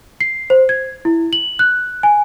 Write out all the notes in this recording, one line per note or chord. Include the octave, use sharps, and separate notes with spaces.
C7
C5
G#6
E4
F#7
F#6
G#5